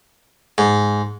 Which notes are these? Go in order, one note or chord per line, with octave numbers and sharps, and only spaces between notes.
G#2